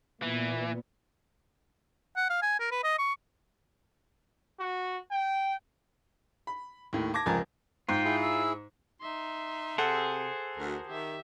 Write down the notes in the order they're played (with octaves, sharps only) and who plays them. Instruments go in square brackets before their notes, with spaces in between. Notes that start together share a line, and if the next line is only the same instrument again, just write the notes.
[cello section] A#2 B3 [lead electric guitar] E3
[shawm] F#5
F5
G#5
A#4
B4
D#5
C#6
[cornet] F#4
G5
[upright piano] B5
D#2 A2
A5 D6 G#6 A#6
F1 C#2 F3 A#4 G#5 A6
[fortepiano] G#2 [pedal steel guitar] F4 [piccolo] G5
[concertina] E4 G#4
[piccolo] E6
[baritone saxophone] D#4 [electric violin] E5 C6
[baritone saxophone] C3 [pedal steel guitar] G#4 C5 [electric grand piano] A4 F#5
[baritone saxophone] D2 [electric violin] F#4 A#4
[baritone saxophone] D#3 [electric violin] G4 E5